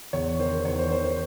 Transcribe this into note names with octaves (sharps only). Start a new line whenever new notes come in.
E2 C#5
D#3 C5
E2 C#5
C5
D#3 C5
C5